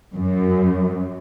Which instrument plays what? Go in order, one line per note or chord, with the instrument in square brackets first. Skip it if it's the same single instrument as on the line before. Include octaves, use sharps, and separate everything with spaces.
[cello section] F#2